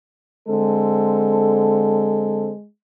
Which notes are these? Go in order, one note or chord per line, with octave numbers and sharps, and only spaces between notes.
D3 G#3 C4 A4